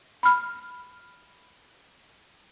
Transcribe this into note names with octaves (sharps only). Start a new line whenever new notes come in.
B5 F6